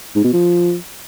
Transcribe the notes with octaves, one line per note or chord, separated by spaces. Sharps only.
G#2
B2
F3